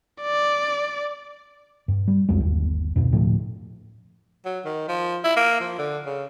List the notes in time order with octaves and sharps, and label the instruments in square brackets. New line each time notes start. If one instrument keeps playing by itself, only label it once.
[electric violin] D5
[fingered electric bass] G2
G3
D#1 B1 F2 G#3
G1 D#2
D1 F#2 B2
D2 A2 F3
[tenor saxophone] F#3
D#3
F3
E4
A#3
F3
D3
C#3